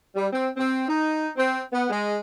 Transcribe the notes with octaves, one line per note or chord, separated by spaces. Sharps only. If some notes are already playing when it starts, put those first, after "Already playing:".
G3
C4
C4
D#4
C4
B3
G#3